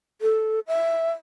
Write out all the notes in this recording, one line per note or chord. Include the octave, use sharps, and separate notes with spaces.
A4
E5